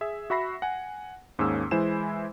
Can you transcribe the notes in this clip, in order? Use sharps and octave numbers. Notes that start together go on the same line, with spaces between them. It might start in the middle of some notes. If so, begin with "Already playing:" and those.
G#4 E5
F#4 E5 B5 A#6 C7
F#5 G#5
D#2 G#2 A#3 C#4 G#4 E6
E3 G#3 E4 C5 G#5 E7